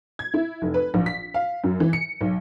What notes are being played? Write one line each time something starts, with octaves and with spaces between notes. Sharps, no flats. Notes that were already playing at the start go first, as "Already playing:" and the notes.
G#6
E4
F1
B4
A#1
B6
F5
F#2
E3
C#7
B1